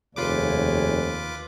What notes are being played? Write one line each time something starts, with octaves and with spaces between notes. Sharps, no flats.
F1 D#2 D#3 F4 G#4 B4 C#5 D6